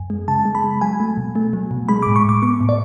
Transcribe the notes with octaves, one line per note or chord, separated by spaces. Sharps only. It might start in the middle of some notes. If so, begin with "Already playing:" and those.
Already playing: F#2 G#5
G#3
C#3 A5
G#3
B5
G#3
F#3 G#5
A3
B2
A3
F#3
B2
G#3 B5
A2 D6
C#6
A2 D6
B3 C#6
A2
D5